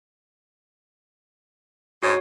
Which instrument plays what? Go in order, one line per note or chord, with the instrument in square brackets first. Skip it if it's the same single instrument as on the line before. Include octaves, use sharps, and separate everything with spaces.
[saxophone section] D2 G#2 [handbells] F#4 C#5